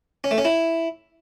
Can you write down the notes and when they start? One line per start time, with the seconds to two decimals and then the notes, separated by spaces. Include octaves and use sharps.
0.24 C#4
0.31 A3
0.38 C#4
0.45 E4